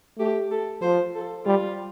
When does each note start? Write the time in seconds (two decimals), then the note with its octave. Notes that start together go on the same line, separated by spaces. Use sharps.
0.19 A3 G4
0.51 A4
0.82 F3 C5
1.14 A4
1.45 G3 F4